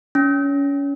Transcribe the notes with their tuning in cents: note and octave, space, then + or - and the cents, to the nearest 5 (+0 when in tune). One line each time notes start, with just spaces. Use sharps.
C#4 +25